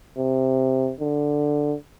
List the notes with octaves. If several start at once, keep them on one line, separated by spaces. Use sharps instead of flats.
C3
D3